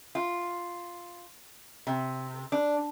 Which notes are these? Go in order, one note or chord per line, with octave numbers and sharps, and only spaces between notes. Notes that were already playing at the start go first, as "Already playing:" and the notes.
F4
C3
D4